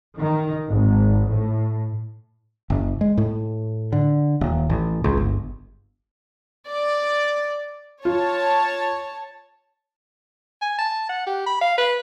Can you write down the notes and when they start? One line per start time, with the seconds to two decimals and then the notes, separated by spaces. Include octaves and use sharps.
0.19 D#3
0.71 G#1
1.30 A2
2.70 F#1
3.01 G#3
3.18 A2
3.93 D3
4.41 D#1
4.70 A1
5.04 C#2
5.17 G1
6.69 D5
8.05 F4 C#5 A5
10.62 G#5
10.78 A5
11.09 F#5
11.26 G4
11.46 B5
11.61 F5
11.78 B4